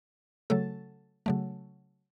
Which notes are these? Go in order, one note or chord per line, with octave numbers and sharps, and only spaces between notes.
C#3 F#3 A3 A4
C#3 F#3 A3